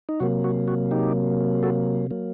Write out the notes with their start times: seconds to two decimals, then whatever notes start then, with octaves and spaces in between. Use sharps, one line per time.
0.09 D#4
0.20 C3 F#3 A#3 F#4
0.44 F#4
0.68 F#4
0.91 D#4 G4
1.63 F#4 A4
2.11 F#3 A#3